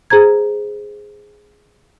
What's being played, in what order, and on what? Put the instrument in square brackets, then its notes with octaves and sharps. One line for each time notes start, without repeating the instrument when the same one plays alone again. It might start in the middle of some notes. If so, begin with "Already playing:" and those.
[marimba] G#4 C5 A#5 G#6